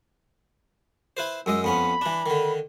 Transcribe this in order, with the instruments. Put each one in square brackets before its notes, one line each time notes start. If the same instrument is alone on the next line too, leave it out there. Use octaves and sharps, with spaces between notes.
[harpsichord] E4 B4 C5
[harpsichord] F#2 G#3 D#5 [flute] E6
[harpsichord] F2 B3 C#4 [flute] B5
[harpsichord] E3 D4
D3 D#3